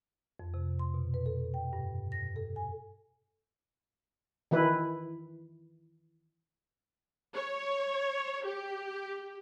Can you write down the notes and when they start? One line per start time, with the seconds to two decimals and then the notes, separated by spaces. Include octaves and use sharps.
0.40 F2
0.54 C3
0.79 C6
0.94 B2
1.14 B4
1.26 A4
1.54 G5
1.73 G2
2.12 A#6
2.36 A4
2.56 G#5
4.51 D#3 E3 E4 B4
7.33 C#5
8.45 G4